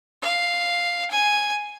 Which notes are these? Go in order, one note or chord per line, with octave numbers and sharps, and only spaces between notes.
F5
G#5